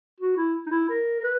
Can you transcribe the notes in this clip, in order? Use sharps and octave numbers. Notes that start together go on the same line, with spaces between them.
F#4
E4
D#4
E4
A#4
A#4
B4